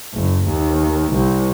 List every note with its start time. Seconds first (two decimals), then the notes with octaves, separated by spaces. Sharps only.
0.13 F#1
0.46 D#2
1.12 C2